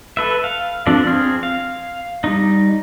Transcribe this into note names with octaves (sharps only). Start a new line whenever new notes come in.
A4 B4 E5
F5
F3 C4 D4 A4 D5
C4 G#4 C6 F6
F5
G3 D#4